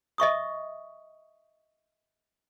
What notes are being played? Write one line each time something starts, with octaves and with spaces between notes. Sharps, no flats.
D#5 E5 C#6 D#6